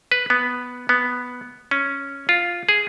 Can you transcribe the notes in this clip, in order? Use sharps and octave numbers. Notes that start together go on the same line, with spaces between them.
B4
B3
B3
C#4
F4
G#4